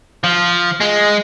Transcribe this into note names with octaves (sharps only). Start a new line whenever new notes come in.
F3
G#3